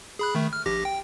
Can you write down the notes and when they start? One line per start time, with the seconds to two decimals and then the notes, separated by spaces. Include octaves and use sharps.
0.19 G#4 B5 F#6
0.35 D#3 A3
0.53 F6
0.66 A#1 G4 A#6
0.85 G5